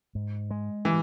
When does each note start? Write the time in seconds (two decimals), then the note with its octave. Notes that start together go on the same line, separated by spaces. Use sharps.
0.15 G#2
0.51 G#3
0.85 E3